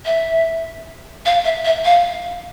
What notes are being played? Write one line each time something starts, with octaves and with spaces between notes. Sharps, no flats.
E5
F5
E5
E5
F5